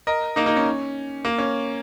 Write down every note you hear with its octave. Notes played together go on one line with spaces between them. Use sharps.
A#4 D#5
A#3 D#4
A#3 D#4
C#4
A#3
C#4